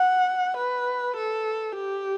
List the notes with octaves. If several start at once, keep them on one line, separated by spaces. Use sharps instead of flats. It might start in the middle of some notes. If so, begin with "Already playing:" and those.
Already playing: F#5
B4
A4
G4